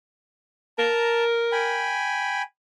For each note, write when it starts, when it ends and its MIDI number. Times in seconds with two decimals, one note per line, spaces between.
0.78 1.99 70
0.78 1.24 81
0.78 1.24 82
1.52 2.42 79
1.52 2.42 80
1.52 2.42 83